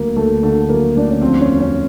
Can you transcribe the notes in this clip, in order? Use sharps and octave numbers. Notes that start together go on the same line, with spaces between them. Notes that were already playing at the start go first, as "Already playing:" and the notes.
Already playing: D2 F#3 A#3
D2 A3
D3 A3
F#3 A#3
D2 D4
C#4
F3 C4
C#4
E2
C#4